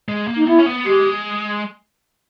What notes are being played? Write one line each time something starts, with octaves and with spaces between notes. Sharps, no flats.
G#3
A#3
D#4
B3 E4
C#4
B3
G#3 G4